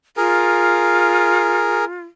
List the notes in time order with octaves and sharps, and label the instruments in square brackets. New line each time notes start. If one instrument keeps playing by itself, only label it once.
[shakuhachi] F4 [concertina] G#4 A#4